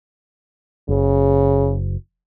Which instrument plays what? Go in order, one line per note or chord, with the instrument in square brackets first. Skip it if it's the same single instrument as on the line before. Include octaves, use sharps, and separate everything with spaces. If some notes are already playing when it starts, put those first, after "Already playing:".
[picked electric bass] F#1 [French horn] C#3